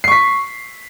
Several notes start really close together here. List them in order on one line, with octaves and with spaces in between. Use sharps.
C7 C#6 B6